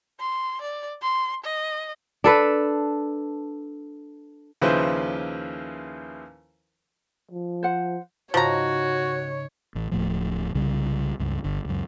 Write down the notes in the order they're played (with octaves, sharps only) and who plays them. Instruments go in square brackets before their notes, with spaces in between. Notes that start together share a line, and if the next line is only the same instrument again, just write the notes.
[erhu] C6
D5
C6
D#5
[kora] D4 A4 B4
[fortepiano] D#2 C#3 F3 E4 B4 C5
[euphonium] F3
[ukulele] C5 F#5
[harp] G#2 C#3 [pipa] F3 A#5 [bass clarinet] F#4 [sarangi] C#5
[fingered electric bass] A1 E3
D1 A2 F3
C2 C#3 G3
C#2 G2
G1 D3
C#2 F#2